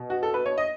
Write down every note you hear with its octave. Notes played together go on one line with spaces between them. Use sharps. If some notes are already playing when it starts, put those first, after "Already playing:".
Already playing: B2
F#4
A4
B4
C#5
D#5